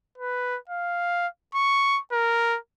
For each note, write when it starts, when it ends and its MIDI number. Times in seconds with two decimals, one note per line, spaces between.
0.18 0.58 71
0.69 1.27 77
1.55 2.00 85
2.12 2.58 70